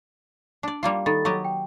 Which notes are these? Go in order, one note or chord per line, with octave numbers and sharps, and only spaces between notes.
D4 D5
G3 A#3 F4
D#3 A4 B5 A6
F#3 G4 D#5
G5